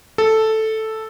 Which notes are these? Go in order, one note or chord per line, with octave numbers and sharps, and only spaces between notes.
A4